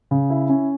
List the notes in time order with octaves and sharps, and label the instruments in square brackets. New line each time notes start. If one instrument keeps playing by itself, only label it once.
[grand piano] C#3
E4
C#4